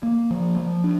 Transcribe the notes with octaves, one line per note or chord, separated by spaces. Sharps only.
A#3
F3
F3
D4